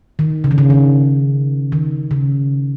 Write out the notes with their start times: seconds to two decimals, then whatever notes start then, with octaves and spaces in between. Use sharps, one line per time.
0.19 D#3
0.44 C#3
0.51 D#3
0.58 C#3
0.70 D#3
1.72 D#3
2.11 C#3